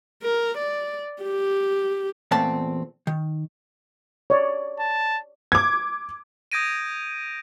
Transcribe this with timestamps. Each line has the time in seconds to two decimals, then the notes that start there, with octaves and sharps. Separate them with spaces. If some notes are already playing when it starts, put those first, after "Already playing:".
0.22 A#4
0.57 D5
1.23 G4
2.31 E2 A#2 A3 C4 A5
3.07 D#3
4.30 C#5 D5
4.79 A5
5.52 D6 G#6
6.52 D#6 G6 G#6 A#6 D7 D#7